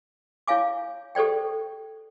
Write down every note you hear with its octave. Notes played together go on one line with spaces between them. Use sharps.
E4 C#5 F5 G#5 D6
G4 A4 C5 D5 G5